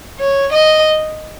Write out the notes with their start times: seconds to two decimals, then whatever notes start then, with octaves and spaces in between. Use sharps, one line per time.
0.19 C#5
0.53 D#5